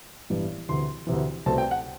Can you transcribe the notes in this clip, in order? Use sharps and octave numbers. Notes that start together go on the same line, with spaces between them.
A1 G2 E3 G3 B3
D2 C3 E3 C6
D2 C3 E3
C2 B2 A3 C4 A5
G5
F#5